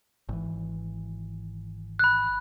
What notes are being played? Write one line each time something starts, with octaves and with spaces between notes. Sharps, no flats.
G#1 E3
B5 F#6